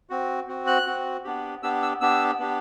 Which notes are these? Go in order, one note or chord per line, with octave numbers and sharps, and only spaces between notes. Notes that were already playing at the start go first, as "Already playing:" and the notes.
C4 F#4
C4 F#4
F#6
C4 F#4
B3 D4 G4
B3 D4 G4 E6
E6
B3 D4 G4 E6
B3 D4 G4